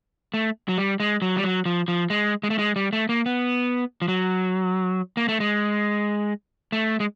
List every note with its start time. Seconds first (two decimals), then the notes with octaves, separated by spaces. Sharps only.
0.34 A3
0.68 F#3
0.78 G3
1.00 G#3
1.22 F#3
1.36 G3
1.44 F#3
1.66 F3
1.88 F3
2.10 G#3
2.43 G#3
2.50 A3
2.59 G#3
2.76 G3
2.93 A3
3.09 A#3
3.26 B3
4.02 F3
4.08 F#3
5.17 A#3
5.28 A3
5.40 G#3
6.72 A3
7.00 G#3